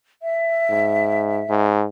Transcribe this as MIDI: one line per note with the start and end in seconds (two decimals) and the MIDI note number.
0.23 1.65 76
0.70 1.43 44
1.49 1.85 44